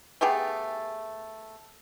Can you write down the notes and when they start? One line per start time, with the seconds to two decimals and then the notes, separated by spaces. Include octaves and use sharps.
0.21 A3 B3 G4 G#4